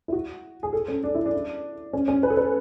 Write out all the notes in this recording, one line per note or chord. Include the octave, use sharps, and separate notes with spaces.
E4
F#4
G#4
A4
C#4
D4
E4
D4
C#4
C#4
B4
A4
B4